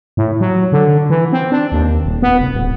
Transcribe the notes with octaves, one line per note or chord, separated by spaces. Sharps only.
A2
F#3
D3
E3
C4
D4
D#2
D#1
B3
F1
D1